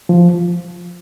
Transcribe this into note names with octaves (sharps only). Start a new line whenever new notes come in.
F3